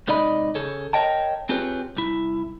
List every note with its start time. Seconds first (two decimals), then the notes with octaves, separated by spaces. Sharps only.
0.07 G#2 C3 D#4 D5 D#5 B5
0.55 C#3 G#4 A4 C#5
0.93 A#4 C#5 D#5 G5 A5
1.49 C4 F4 G4 G#4 B4 C#5
1.97 C2 E4